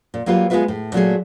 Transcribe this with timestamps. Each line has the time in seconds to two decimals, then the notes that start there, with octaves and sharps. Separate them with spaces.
0.14 A#2
0.26 F#3 G3 A#3 F4 G4 B4
0.50 G#3 B3 C4 F4 B4 E5
0.68 A2
0.93 A#2 F#3 A3 G#4